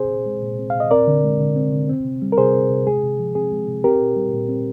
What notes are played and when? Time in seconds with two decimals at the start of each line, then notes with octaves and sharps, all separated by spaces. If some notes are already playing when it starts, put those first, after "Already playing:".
Already playing: C3 C4 G#4 C5
0.10 A#2
0.26 G#3
0.42 A#2
0.59 C4
0.70 A#2 F5
0.80 D#5
0.91 C4 A#4 D5
1.07 D3
1.24 G#3
1.40 D3
1.56 C4
1.73 D3
1.89 C4
2.05 C3
2.22 G3
2.32 A#4
2.38 C3 G#4 C5
2.54 C4
2.70 C3
2.87 G#3 G#4
3.03 C3
3.19 F3
3.35 C4 G#4
3.52 G#3
3.67 C3
3.84 C4 G4 A#4
4.01 A#2
4.16 G3
4.33 A#2
4.49 C4